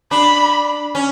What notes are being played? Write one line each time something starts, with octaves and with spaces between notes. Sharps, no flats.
D4 B5
C#4